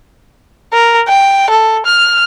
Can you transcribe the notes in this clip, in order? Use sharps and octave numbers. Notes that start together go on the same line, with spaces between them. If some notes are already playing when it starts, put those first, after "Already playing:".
A#4
G5
A4
F6